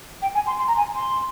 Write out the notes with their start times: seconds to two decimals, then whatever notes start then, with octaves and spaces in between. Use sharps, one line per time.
0.22 G5
0.34 G#5
0.46 C6
0.58 C6
0.67 A#5
0.77 G#5
0.95 C6